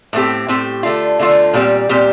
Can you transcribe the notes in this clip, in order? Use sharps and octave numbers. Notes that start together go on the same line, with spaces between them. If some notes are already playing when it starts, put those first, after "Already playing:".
A2 A3 C4 G4
A2 A3 C4 G4
D3 A3 D4 F4
D3 A3 D4 F4
A#2 G3 C4 G4
A#2 G3 C4 G4